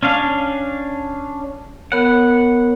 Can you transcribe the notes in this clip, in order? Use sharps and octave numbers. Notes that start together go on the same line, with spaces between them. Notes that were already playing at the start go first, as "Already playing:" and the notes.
C#4 D4 F5
B3 A#4 C#5 F#5